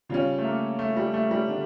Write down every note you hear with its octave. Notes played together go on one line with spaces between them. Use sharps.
C#3 G3 C#4 F4
A3
A#3
A3
G3
A3
G3
D3 A3 D4